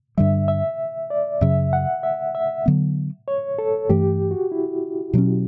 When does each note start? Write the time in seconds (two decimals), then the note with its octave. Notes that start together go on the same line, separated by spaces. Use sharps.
0.17 G2 D3 G3 E5
0.48 E5
1.10 D5
1.41 F#2 C#3 F#3 E5
1.73 F#5
2.03 E5
2.35 E5
2.66 D3 F#3 B3
3.28 C#5
3.58 A4
3.89 G2 E3 A3 G4
4.31 F#4
4.52 E4
5.13 B2 F#3 C#4